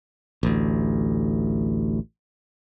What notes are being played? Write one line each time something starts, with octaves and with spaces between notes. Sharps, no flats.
A1 D2